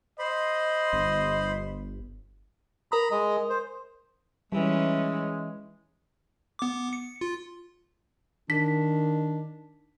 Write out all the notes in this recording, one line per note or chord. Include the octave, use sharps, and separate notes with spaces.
C5 D#5 B5 C6
G1
A#4 A#5 B5 D#6
G#3 D#5
C5
E3 G3 G#3 C#4 D#4
B3 D6
C#7
F4
D#3 D4 B6